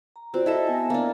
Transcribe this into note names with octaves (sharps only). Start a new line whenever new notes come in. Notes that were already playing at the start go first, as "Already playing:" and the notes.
A#5
C4 F4 F#4 C5 D5
E4 A4 D#5 E5
B3 G#5
A#3 D4